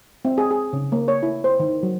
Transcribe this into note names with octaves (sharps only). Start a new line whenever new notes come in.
C4
G#4
G#4
C#3
A#3
C#5
E4
C5
D#3
F#3